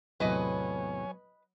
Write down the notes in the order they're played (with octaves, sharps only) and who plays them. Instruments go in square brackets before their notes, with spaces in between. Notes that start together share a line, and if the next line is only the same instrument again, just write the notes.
[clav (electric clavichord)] E2 A2 C3 [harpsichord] F#3 [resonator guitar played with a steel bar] B4 D#5 [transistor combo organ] C#5 G#5